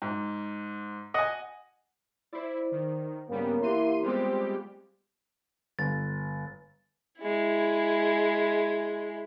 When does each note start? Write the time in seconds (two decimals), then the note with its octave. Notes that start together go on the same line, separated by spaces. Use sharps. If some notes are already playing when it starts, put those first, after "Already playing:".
0.02 G#2
1.14 D#5 F#5 G#5
2.33 E4 C5 D5
2.72 D#3
3.29 G2 C#3 G3 A#3 B3
3.62 E3 E4 G4 C6 D#7
4.03 G3 G#3 B3 C4 F4 G4 C6
5.79 G1 A6
7.19 G#3 E4